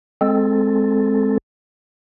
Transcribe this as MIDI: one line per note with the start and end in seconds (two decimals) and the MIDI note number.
0.21 1.38 56
0.21 1.38 60
0.21 1.38 69